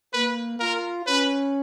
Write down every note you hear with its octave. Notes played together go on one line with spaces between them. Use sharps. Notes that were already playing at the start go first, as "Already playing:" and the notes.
A#3 B4
F4 A#4
C#4 B4